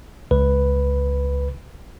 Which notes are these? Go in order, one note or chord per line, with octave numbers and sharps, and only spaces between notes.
C#2 B4